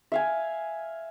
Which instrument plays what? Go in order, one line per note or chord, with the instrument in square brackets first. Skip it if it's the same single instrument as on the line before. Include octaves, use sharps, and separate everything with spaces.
[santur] E5 F5 G#5